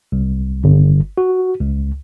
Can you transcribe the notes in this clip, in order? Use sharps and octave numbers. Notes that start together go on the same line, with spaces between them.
C2
G1
F#4
C#2